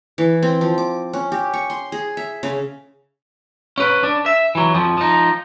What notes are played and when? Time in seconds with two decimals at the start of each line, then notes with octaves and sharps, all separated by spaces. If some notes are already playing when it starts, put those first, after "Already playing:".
0.18 E3
0.43 C4
0.61 F3
0.78 D6
1.13 C#4
1.32 G4
1.53 C#6
1.70 C6
1.92 G#4
2.17 E5
2.43 C#3
3.78 C#4 B4
4.03 D4
4.26 E5
4.55 E3 F#3
4.74 F2 F3
4.97 F3 D#4